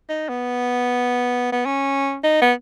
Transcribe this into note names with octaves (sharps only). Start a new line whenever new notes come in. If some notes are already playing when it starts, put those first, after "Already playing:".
D#4
B3
B3
C#4
D#4
B3